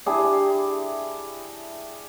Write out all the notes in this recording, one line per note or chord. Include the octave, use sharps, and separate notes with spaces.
D4 E4 G4 G#4